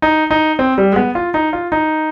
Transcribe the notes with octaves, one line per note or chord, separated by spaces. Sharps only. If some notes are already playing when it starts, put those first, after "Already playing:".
D#4
D#4
C4
G3
G#3
B3
F4
D#4
F4
D#4